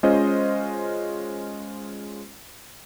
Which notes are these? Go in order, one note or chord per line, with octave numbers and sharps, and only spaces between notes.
G#3 C#4 F4 C5 D#5